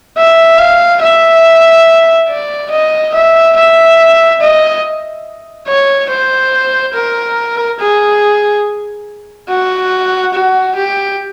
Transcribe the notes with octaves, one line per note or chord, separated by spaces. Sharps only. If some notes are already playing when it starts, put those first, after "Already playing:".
E5
F5
E5
D5
D#5
E5
E5
D#5
C#5
C5
A#4
G#4
F#4
F#4
G4